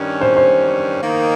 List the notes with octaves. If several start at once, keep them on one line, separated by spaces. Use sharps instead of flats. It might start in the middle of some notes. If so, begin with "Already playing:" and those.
Already playing: G2 D#3 G3 C#4
C5
C5
D#3 A#3 D#4